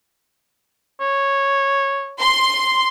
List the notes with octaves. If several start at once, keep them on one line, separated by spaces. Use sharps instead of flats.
C#5
C6